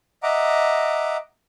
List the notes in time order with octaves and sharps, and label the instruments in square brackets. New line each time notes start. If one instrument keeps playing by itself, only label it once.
[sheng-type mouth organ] D#5 E5 F#5 A#5 D6